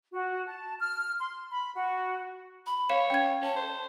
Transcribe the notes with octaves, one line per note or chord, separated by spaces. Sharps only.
F#4
A5
F6
C6
B5
F#4
B5
C#5 F5 E7
C#4 G5 G#6
C#4 A5
C5